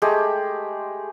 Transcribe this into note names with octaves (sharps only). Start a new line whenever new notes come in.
G#3 A3 G4 G#4